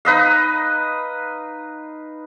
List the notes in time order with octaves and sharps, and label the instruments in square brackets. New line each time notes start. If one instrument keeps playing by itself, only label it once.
[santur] D#4 B4 D#5 F5